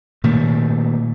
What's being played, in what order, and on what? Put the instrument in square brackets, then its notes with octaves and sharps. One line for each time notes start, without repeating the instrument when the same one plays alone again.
[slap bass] A#2 D#3 A3